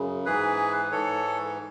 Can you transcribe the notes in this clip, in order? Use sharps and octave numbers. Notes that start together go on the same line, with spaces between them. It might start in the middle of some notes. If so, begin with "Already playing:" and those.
Already playing: F#2 C#3
G#2 E3 G#4 B4
G#2 E3 A4 C#5